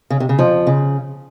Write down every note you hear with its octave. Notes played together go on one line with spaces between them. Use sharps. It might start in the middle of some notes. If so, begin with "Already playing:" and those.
C#3
C3
C#3
F2 F3
C#3